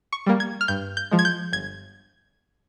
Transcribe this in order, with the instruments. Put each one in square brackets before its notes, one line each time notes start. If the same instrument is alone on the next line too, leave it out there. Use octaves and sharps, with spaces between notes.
[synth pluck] C#6
G3 A#3
G#6
F6
G2 G6
G6
F3 G#3
G#6
G6
G1 G#6